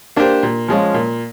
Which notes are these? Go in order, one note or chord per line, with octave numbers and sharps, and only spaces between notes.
A#3 D4 G4 C5
A#2
F3 G#3 C#4 F4
A#2